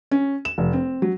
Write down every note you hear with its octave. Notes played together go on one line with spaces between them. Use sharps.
C#4
E7
F1
C4
F#3